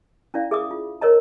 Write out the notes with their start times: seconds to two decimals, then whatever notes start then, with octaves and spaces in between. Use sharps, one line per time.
0.34 C#4 E4 D5 F5
0.51 G#4 E5 D6 D#6
0.71 F4
1.01 A#4 C#5 D#5 A#5